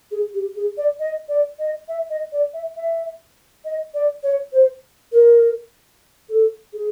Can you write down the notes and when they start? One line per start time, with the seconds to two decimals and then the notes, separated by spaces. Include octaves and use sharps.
0.11 G#4
0.34 G4
0.56 G#4
0.77 D5
1.00 D#5
1.29 D5
1.59 D#5
1.88 E5
2.10 D#5
2.32 D5
2.54 E5
2.76 E5
3.65 D#5
3.94 D5
4.23 C#5
4.53 C5
5.12 A#4
6.29 A4
6.73 G#4